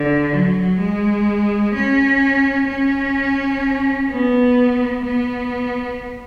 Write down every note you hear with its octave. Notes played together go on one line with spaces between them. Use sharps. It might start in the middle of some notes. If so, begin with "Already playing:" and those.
Already playing: D3
F#3
G#3
C#4
C#4
B3
B3